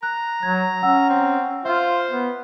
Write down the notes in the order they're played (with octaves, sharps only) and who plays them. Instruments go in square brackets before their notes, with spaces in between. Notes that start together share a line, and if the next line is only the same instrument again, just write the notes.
[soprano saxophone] A#5 [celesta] F#6
[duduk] F#3 [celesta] G#6
[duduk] C#4 [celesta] F#5 E6
[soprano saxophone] C4
[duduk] F4 [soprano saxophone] C5 [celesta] E5
[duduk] B3